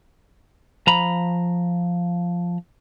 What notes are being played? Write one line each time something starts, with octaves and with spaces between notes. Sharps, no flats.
F3 A#5 B5